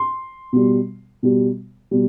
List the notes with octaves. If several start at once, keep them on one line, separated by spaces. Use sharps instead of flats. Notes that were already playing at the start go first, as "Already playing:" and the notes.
Already playing: C6
B2 G3
B2 G3
B2 G3